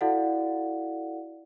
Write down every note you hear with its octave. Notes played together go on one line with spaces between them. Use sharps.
E4 F#4 A4 D5 F5 F#5